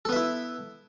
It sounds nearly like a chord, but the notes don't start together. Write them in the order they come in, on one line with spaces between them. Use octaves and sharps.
A4 B3 E5 E4